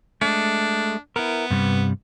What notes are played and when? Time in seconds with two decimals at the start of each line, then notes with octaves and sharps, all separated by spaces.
0.22 G#3 A3 D4
1.16 B3 E4 A#4
1.50 G2 C3 G3